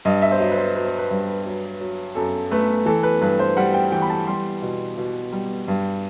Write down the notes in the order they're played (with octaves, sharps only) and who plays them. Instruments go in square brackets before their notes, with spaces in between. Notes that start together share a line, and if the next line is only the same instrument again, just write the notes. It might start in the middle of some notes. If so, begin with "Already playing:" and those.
[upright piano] G2 D#5
E5
C5
F#3 D#5
B4
C5
F#3 B4
C5
B4
G2
F#3
F#3
F#2 A4
A3 B4
E3 A4
B4
G2 B4
C5
G3 F#5
G5
E3 G5
B5
A5
G3 C6
B2
B2
G3
G2